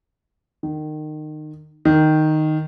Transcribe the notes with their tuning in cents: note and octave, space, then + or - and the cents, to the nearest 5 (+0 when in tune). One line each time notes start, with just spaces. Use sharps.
D#3 -25
D#3 -5